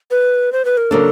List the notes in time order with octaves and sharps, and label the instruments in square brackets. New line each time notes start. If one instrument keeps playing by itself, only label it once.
[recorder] B4
C5
B4
A#4
[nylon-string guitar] C#3 F#3 A#3 D4 [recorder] A4